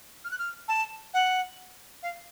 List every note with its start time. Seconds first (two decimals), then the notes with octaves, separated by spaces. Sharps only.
0.24 F6
0.31 F#6
0.39 F6
0.68 A5
1.14 F#5
2.02 F5